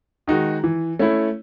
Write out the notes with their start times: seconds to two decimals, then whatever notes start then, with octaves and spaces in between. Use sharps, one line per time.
0.27 D#3 G#3 D#4 F#4
0.64 E3
0.99 A3 C#4 E4